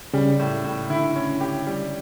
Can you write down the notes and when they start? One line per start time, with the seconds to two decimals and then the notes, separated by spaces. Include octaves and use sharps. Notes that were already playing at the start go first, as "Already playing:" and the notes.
0.14 C#3 G3
0.39 A2
0.64 A2
0.90 D3 E4
1.16 C#4
1.41 G4
1.67 G3